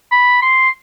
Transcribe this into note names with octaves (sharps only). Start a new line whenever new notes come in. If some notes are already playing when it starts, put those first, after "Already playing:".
B5
C6